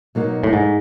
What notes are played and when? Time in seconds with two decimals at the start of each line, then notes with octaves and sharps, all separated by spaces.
0.15 B2 F#3 A#3 D#4
0.43 A2
0.53 G#2